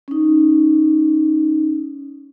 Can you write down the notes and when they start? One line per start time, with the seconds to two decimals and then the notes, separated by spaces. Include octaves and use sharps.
0.08 C#4 D#4